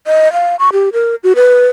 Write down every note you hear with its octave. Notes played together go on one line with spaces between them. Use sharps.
D#5
F5
C#6
G4
A#4
F#4
B4